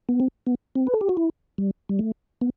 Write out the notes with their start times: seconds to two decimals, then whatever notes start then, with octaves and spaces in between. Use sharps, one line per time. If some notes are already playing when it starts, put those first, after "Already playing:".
0.09 B3
0.20 C4
0.47 B3
0.75 C4
0.87 B4
0.94 A4
1.01 G4
1.09 F#4
1.17 E4
1.58 G3
1.89 G3
1.99 A3
2.41 B3